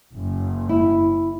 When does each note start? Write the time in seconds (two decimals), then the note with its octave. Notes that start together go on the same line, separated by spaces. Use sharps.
0.14 F#1
0.69 E4